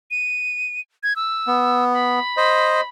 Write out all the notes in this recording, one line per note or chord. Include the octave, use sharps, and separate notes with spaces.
D#7
G#6
E6
B3
B5
C5 D#5